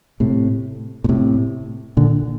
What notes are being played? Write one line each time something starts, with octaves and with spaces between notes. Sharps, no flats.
A2 C3
A#2
A2 C3
A#2 D3